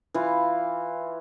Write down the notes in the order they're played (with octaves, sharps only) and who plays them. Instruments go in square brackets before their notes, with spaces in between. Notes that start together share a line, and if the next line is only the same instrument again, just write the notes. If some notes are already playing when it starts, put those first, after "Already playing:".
[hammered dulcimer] E3 F4